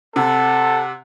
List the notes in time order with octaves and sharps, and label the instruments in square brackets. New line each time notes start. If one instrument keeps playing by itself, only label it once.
[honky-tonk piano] C3 [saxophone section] C4 F#5 [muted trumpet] A4